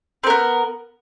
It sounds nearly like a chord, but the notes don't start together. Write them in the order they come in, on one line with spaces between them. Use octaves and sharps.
C4 A#4 B3